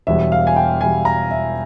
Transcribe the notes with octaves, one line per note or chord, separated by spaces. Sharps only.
E1 E2 E3 G3 E5
F5
G#5
G5
E1 E2 E3 G3 G#5
A#5
E5